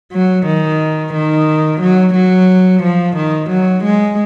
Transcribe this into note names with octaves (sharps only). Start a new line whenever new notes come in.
F#3
D#3
D#3
F#3
F#3
F3
D#3
F#3
G#3